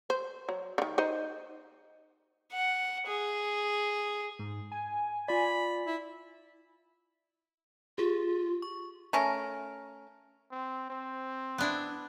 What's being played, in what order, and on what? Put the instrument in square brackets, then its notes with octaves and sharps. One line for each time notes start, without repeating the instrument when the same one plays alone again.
[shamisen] C5
F#3
D3 D#3
D#4 C5 D#5
[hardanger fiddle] F#5
G#4
[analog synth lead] G#2
G#5
[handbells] F4 D5 [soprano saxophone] B5
[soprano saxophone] E4
[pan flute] F4 [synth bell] G4 G#4
[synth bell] C#6
[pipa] A3 C#4 A#4
[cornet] C4
C4
[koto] B3 D4 E4